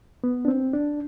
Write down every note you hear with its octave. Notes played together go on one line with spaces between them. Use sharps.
B3
D4
C4
D4